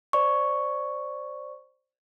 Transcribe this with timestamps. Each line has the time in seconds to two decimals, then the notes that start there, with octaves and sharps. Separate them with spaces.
0.13 C5 D5 C#6